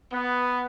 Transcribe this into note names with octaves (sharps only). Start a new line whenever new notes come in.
B3